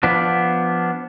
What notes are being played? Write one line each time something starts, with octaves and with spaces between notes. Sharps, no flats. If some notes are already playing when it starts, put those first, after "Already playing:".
F3 B3 D4